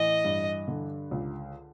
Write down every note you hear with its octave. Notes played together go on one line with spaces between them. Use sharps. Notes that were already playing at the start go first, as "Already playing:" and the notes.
Already playing: A2 E3 D#5
G2
D3
C#2